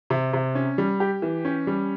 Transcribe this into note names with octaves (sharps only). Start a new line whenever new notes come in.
C3
C3
C#4
G3
G4
E3
C#4
G3